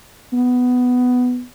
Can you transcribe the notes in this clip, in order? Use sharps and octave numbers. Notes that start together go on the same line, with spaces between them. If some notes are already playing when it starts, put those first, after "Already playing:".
B3